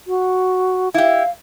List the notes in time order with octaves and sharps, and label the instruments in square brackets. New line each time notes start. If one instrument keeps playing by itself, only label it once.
[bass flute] F#4
[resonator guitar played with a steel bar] E4 G4 [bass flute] F5